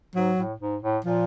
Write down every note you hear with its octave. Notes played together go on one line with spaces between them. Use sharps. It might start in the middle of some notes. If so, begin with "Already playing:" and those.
G#2 F#3
A2
G#2
A2
A#2 F3